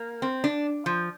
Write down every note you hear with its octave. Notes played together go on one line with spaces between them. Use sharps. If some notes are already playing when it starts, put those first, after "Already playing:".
Already playing: A#3
C4
D4
F3